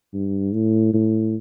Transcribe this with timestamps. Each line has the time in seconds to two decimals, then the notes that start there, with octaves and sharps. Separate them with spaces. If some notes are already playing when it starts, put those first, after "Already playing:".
0.14 G2
0.54 A2
0.94 A2